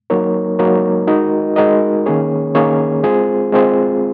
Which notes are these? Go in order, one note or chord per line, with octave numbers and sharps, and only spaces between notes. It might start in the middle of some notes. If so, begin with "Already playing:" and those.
F#3 A#3 D#4 A#4 C#5
F#3 A#3 D#4 A#4 C#5
G#3 D#4 F#4 A#4 D#5
G#3 D#4 F#4 A#4 D#5
D#3 A#3 C#4 G#4 C#5
D#3 A#3 C#4 G#4 C#5
G#3 C4 F4 G#4 C5
G#3 C4 F4 G#4 C5